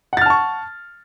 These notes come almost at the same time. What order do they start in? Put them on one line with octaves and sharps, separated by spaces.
F#5 A6 F6 A5 C#6